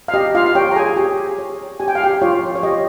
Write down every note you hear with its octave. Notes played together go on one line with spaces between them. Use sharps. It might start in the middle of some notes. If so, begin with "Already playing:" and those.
F5
G4 D#5
F4 F5
F5
G4 C#5 G5
A#5
G#4 G#5
G4
C#5
G4 G#5
G5
F5
G4 G5
F4 C#5 F5
C#5
G4 D#5